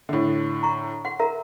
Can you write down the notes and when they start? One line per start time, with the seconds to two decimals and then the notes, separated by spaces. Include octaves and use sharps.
0.09 A2 D3
0.63 A#5 C#6
1.05 F#5 C6
1.19 A#4 E5 A#5